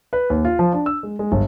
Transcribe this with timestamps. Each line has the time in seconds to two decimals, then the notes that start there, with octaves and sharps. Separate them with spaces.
0.13 B4
0.30 D#2
0.45 F4
0.59 F3
0.73 D4
0.86 E6
1.03 G#3
1.19 G#3
1.32 G1